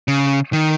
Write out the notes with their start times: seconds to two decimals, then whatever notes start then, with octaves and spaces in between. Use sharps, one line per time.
0.08 C#3
0.53 D#3